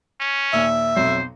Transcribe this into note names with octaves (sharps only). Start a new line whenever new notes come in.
C#4
D#2 A#2 E5
B1 F2 F#3 C5